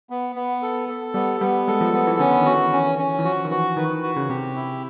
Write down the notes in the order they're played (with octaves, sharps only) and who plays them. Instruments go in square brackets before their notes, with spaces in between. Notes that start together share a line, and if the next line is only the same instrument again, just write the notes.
[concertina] B3
B3
A4
A4
[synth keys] G3 [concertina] B3
[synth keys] G3 [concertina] B3
[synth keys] G#3 [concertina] A4
[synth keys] F3
[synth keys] F3 [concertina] B3
[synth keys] E3
[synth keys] D3 [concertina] C#4
[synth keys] D3
D#3
[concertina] F#4
[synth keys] E3
[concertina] C#4
C#4
[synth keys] E3
[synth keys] F3 [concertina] F#4
[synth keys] D#3
[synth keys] E3 [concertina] F#4
[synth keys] D#3 [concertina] B4
[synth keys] D#3
[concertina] F#4
[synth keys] C#3
[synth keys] C3 [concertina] G4
[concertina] E4